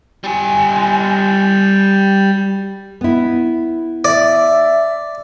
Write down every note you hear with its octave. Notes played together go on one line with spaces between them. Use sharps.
G3 G#5
B3 E4
D5 E5